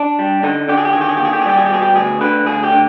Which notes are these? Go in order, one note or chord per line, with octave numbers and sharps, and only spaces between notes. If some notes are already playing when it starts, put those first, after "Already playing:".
Already playing: D4
G3
D3 D#4
D3 G4
G#4
G4
D#3 G#4
G4
G#4
D#2 G4
G#4
G4
G#4
G3 G4
G#4
G4
B2 G#4
G4
D2 G#4
D3 B4
D2 G#4
G4
D3